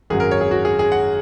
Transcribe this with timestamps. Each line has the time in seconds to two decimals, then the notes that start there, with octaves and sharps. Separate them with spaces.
0.10 G#1 F#2 F#3 G#4
0.20 A#4
0.31 C#5
0.41 G#4
0.51 F#4
0.65 G#4
0.79 G#4
0.92 F#5